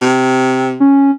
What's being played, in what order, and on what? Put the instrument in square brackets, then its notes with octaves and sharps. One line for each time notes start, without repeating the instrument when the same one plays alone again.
[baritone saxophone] C3
[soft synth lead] C#4